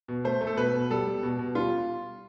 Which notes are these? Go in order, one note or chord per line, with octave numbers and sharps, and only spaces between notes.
B2
A3 C5
A3
A4
B2 B4
B2
G3 A4
G3
B2
B2
G3 F4